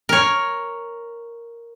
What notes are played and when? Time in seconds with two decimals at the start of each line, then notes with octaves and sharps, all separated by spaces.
0.09 A#4 C#5